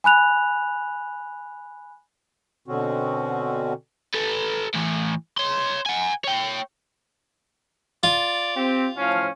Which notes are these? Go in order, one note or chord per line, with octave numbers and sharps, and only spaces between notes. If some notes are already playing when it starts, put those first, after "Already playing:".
G#5 B5 F#6 F7
B2 D3 C4 C#4 F#4
A4 B4
A2 E3
C#5 C6
F#5 G#5
C#5 G5
F4 D5
C4 G4
A2 F3 C#4 F5